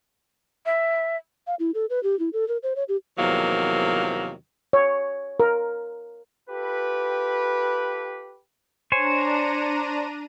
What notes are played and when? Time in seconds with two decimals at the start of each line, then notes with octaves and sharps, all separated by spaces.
0.66 E5
1.47 F5
1.59 E4
1.74 A4
1.90 B4
2.03 G4
2.19 E4
2.33 A4
2.48 A#4
2.63 C5
2.76 C#5
2.89 G4
3.18 E2 C3 D#3 F3 F#3 A#3
4.73 C#5
5.40 A#4
6.49 F4 G4 A4 B4
8.92 D4 C5 C#5 G#5 A#5 D#7